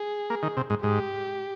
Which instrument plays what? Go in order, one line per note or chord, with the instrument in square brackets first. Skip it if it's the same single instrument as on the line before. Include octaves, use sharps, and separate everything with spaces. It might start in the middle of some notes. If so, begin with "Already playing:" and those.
Already playing: [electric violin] G#4
[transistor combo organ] A#3
D#3
C3
G#2
[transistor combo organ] G#2 [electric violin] G4